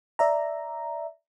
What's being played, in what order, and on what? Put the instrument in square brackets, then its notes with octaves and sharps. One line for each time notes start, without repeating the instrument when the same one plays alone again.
[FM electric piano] D5 E5 A#5